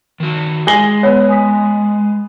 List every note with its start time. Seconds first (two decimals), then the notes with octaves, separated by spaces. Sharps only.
0.20 D#3 F#4
0.67 G#3 G#4 A#6 G7
1.03 B3 C#5
1.29 G#5 D#6 B6